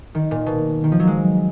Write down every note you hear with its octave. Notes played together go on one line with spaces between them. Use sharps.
D#3
A#2
B2
D#3
F3
F#3
G#3